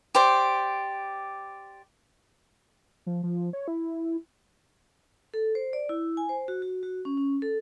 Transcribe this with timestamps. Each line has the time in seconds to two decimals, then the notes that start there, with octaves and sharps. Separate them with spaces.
0.15 G4 C5 D5
3.06 F3
3.23 F3
3.53 C#5
3.68 E4
5.34 A4
5.55 C5
5.73 D5
5.89 E4
6.17 G#5
6.29 C5
6.48 F#4
6.62 F#4
6.83 F#4
7.05 C#4
7.17 C#4
7.42 A4